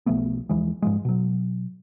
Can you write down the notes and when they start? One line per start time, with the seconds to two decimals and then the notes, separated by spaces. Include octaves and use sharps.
0.06 B1 F3 A3 B3
0.49 D#2 E3 F3 G#3
0.82 G#2 F3 G#3
1.05 B2 F#3